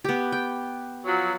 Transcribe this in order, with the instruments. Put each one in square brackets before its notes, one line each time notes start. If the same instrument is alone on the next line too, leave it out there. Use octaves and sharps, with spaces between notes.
[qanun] B3 G4
G5
[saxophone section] F3 F#3